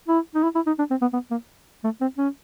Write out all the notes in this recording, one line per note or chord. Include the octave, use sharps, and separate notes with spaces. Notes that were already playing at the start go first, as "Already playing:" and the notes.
E4
D#4
E4
E4
D#4
D4
C4
B3
B3
A#3
A3
C4
C#4